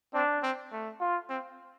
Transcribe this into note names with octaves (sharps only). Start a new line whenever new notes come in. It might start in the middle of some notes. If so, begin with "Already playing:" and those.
C4 D4
C4
A3
F4
C4